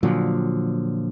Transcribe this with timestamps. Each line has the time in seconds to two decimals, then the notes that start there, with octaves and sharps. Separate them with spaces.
0.03 A#2 D3 F3 F#3